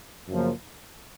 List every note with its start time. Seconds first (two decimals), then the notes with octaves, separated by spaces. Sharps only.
0.29 F#2 C#3 F3 A#3